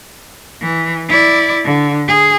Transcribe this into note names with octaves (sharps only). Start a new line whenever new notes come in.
E3
E4 D5
D3
G#4